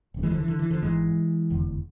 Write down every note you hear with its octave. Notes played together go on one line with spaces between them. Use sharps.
E1 D2 C3
E3 G#3
D3 F3
E3
D3
E3
D3 F3
G#1 G#2 E3 G#3
F1 E2 D3